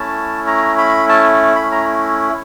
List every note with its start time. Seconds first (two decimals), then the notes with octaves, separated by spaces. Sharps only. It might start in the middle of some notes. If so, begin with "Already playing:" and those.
Already playing: A3 C#4 E4 A5
0.47 A#5
0.78 B5
1.09 A5
1.55 B5
1.71 A#5